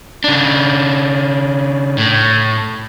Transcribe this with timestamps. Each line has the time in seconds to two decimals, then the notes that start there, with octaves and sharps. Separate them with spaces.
0.24 C#3 D4
1.98 A2